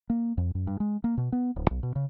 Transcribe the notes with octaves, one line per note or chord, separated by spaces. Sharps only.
A#3
F2
F#2
G2
G#3
A#3
B2
B3
D1
B1
B2
C#3